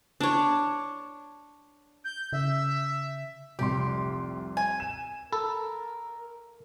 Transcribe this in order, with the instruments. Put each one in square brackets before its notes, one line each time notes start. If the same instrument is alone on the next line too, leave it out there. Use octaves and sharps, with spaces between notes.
[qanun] D4 C#5
[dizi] G6
[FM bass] C#3 [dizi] E5
[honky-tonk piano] F1 C2 C6 [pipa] G4
[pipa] G#5
[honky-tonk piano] E7
[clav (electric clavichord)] A4 [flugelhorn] A#4 [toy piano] B5